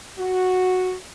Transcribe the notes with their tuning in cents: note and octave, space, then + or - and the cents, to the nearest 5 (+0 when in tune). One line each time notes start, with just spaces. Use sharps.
F#4 -5